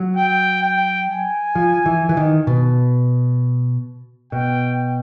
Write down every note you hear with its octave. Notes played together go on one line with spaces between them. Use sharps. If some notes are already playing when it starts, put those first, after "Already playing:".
Already playing: F#3
G5
G5
G#5
F3
E3
E3
D#3
B2
B2 G5